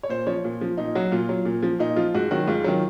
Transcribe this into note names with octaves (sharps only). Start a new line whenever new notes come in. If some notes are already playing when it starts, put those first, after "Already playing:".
C#5
A#2 C5
F3 C#5
A#2
F3
A#2 D#4
F#3 F#4
A#2 F4
F#3
A#2
F3
A#2 D#4
F3 F4
G#2 F#4
D#3 F#3 F#4
G#2 F4
D#3 F#3